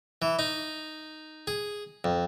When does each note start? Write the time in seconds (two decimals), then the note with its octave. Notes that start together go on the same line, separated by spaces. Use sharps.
0.22 E3
0.39 D#4
1.47 G#4
2.04 F2